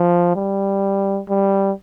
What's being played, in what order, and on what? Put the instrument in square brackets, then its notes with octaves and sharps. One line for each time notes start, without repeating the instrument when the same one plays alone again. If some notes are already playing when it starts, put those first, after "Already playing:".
Already playing: [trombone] F3
G3
G3